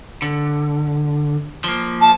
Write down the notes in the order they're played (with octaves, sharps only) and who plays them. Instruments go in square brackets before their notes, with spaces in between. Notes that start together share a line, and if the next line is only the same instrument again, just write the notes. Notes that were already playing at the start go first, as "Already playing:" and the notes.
[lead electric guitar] D3
F3 A#3
[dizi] A5